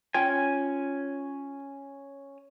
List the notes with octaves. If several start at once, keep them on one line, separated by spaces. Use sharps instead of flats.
C#4 F4 G5 G#5